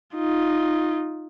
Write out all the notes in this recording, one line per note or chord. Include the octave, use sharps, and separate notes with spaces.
D#4 F4